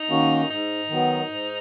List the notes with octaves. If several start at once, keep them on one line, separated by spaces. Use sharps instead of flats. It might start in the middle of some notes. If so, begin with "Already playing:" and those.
Already playing: D#4
D#3 A#3 C#4 F#4
G#2 D#4
D#3 F#3 B3
G#2